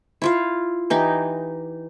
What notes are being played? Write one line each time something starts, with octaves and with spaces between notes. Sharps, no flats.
E4 F4 F5
E3 D#4 G4